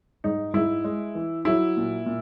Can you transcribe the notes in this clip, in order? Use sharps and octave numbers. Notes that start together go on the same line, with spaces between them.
G#2 D#4
G#2 E4
G#3
E3
F#3 E4
A#2
A#2